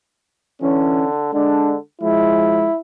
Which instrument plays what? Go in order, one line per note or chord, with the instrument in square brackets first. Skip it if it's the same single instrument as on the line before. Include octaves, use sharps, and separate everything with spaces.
[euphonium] D3 [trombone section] E3 C#4
[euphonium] D3 [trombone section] G#3 D4
[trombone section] F3 G#3 [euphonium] E4